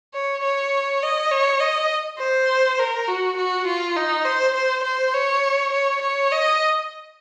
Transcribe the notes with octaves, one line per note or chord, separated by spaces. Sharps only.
C#5
C#5
D#5
C#5
D#5
C5
A#4
F#4
F#4
F4
D#4
C5
C5
C5
C#5
C#5
C#5
D#5